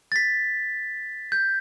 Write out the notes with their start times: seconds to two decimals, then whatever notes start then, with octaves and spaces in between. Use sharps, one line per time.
0.12 A6 B6
1.32 G6